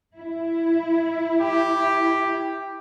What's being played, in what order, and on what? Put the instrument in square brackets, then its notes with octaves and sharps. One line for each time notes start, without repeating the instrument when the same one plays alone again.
[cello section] E4
[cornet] G4